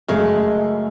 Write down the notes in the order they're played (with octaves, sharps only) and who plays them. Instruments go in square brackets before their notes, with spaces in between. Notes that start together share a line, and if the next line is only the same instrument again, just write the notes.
[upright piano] F#2 A3 [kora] C#3 G#3